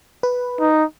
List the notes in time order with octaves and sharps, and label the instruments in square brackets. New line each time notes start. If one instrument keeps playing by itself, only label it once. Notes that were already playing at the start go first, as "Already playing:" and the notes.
[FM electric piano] B4
[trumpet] D#4